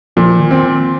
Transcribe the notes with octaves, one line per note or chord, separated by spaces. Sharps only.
A#2 F3
D#3
C4